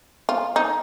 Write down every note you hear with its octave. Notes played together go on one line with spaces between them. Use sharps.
F4
D#4